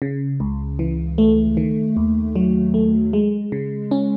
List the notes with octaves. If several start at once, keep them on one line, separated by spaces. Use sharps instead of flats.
C#3
C#2
E3
A3
D#3
D#2
F#3
A3
G#3
C#3
C#4